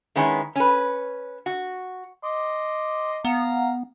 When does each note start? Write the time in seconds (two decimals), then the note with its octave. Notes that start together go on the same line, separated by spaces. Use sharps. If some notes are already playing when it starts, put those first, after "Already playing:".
0.16 D#3 G#3 B3 C#4 E4
0.56 C#4 B4
1.46 F#4
2.23 D#5 C6 D6
3.25 B3 F5 A#5